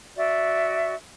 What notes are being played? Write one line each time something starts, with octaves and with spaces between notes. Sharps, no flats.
F#4 D5 E5